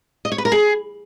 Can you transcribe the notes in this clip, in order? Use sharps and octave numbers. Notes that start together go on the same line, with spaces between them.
D#5
C#5
B4
A#4
G#4